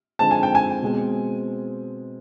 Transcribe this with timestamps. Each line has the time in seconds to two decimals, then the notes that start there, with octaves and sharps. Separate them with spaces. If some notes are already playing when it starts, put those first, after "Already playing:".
0.19 D3 F3 G#3 C4 D#4 A5
0.31 G#5
0.43 G5
0.55 G#5
0.82 B2 G#3 C4